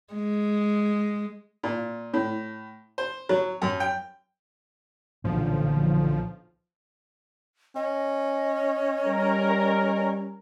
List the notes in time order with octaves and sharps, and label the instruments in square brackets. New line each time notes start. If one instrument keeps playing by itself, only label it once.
[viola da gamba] G#3
[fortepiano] A#2
A2
C5
F#3
F#2
G5
[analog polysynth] B1 F3 [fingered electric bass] A#2 E3 [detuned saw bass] D3
[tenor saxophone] C#4 [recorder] D#5
[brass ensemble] G3 [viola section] A#4